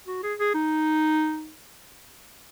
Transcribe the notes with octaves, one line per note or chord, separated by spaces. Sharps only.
F#4
G#4
G#4
D#4